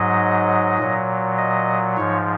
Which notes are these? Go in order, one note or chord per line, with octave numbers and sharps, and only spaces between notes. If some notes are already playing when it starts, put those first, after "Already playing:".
Already playing: G#2 F#3 D#5
A#2 F#3
D#5
G#2 F3 C#5